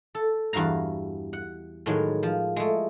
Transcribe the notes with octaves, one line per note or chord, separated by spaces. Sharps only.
A4
E2 G2 F#4 F5 A#5
F#5
A2 D#3 F#3 G#3
F3
G#3 A3